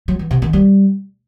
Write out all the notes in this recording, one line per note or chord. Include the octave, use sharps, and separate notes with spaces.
F#3
E3
C3
D#3
G3